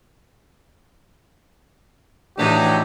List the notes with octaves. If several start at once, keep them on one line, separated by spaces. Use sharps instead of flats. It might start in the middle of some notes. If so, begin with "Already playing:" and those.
A2 E3 F#3 D4 D#4 G4